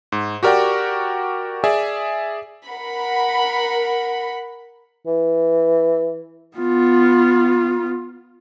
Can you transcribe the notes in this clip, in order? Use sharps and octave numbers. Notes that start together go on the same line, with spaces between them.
G#2
F#4 G4 A#4 D5 F#5 G5
G#4 D5 E5 G#5
A#4 F#5 B5
E3
B3 F4